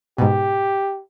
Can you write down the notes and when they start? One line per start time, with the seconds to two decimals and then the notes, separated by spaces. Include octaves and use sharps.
0.18 G#2 B2 G4